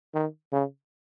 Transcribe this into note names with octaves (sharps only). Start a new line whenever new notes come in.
D#3
C#3